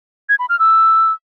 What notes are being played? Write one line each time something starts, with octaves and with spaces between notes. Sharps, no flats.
G#6
B5
F6
E6